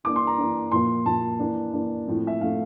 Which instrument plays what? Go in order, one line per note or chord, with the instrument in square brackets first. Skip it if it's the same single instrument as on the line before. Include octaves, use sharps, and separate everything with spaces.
[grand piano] E3 A#3 D4 D6
C6
A#5
E3 A#3 D4
A#2 F3 A#3 C6
A#2 F3 A#3 A5
E3 A#3 D4
E3 A#3 D4
A2 F3 A3 C4
E5
A2 F3 A3 C4 F5